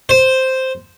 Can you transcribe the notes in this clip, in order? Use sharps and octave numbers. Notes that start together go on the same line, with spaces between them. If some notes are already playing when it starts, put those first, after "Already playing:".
C5